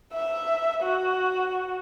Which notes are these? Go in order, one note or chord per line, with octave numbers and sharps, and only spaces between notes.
E5
F#4